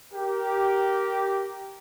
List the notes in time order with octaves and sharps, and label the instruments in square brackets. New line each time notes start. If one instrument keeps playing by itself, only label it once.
[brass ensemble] G4 A#4